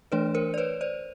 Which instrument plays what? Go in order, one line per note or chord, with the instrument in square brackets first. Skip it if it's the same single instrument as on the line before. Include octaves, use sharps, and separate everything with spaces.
[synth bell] E3 A3 D4 B4 C#5
A#4 C5
D5
B4 C#5
C5 D5